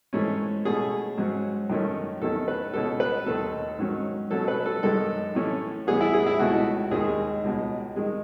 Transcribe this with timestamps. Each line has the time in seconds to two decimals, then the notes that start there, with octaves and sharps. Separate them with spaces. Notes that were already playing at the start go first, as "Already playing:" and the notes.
0.13 G#2 E3 A3 C#4
0.65 B2 A3 C#4 G#4
1.17 G#2 F#3 C#4
1.70 F#2 D#3 A3 C#4
2.22 E2 D#3 A3 C#4 A4
2.48 B4
2.73 C#2 B2 G#3 C#4 A4
3.00 B4
3.26 D#2 D#3 A3 A4
3.79 G#2 D#3 F#3 C#4
4.31 B2 F#3 A3 C#4 A4
4.48 B4
4.66 A4
4.83 F#2 D#3 G#3 A4
5.35 A2 E3 A3 C#4
5.87 A2 E3 B3 G#4
6.01 E4
6.14 G#4
6.26 E4
6.39 C#2 B2 A3 F#4
6.91 D#2 D#3 G#3 G#4
7.44 C#2 B2 G#3
7.96 D#3 G#3